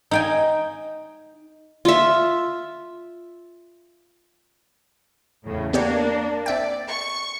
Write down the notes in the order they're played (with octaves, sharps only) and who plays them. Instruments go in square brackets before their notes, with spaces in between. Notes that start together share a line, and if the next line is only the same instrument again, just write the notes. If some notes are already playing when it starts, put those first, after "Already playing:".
[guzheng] D#4 G5 G#5
[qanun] F4 E5
[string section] E2 A2 C#3
[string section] A#3 D4 [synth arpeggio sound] B3 G4 C#5
[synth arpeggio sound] C4 E5 G5 [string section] D5
[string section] C#6